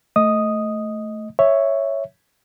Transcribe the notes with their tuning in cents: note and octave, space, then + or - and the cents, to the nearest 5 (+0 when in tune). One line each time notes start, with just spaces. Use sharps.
A3 +0 D#5 +10 D#6 +0
C#5 +0 E5 +0